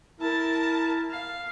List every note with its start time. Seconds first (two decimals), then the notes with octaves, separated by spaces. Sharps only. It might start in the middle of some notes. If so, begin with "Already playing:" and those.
0.20 E4 A#4 A5
1.11 F5